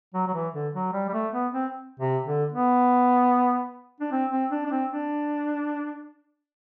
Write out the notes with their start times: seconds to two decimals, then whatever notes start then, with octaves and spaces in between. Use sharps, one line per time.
0.14 F#3
0.27 F#3
0.34 E3
0.54 D3
0.74 F#3
0.93 G3
1.09 G3
1.14 A3
1.33 B3
1.53 C4
2.00 C3
2.25 D3
2.52 B3
4.00 D4
4.12 C4
4.31 C4
4.51 D4
4.66 D4
4.71 C4
4.91 D4